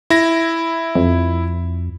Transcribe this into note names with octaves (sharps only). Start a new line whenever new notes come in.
E4 A#6
F2